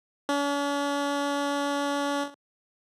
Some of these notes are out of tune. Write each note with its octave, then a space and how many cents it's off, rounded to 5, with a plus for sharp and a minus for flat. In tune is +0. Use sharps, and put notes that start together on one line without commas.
C#4 +45